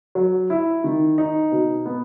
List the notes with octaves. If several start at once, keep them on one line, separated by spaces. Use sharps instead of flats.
F#3
E4
D#3
D#4
B2
B3